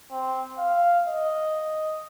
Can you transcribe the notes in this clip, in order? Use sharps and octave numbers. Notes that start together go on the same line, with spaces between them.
C4
F5
D#5